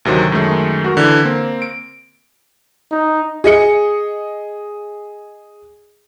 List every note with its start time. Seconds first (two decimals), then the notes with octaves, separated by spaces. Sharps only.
0.05 D2 C3 D#3 F#3
0.32 F#2 D#3 G#3 A3
0.84 F#4 A#4
0.97 D3 E3
1.24 A#3 C4
1.62 D7
2.91 D#4
3.44 G#4 D#5 C#7